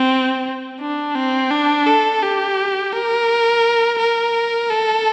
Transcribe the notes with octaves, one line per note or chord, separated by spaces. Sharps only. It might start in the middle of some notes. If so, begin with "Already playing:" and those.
Already playing: C4
D4
C4
D4
A4
G4
A#4
A#4
A4